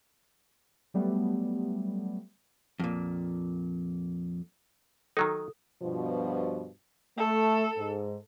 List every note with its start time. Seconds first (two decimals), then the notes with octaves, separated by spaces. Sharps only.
0.94 F#3 G3 A3 B3
2.80 F2 A#2
5.17 D#3 F#3 D#4 A4
5.81 G2 B2 F3
7.18 A3 A4
7.77 G#2